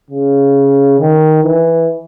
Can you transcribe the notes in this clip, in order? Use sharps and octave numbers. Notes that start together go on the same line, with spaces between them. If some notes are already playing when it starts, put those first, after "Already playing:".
C#3
D#3
E3